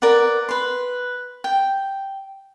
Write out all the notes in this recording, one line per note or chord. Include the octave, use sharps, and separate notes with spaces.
A#4 B4 D5 F#5
B4 C6
G5